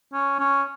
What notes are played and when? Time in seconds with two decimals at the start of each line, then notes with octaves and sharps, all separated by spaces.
0.13 C#4
0.39 C#4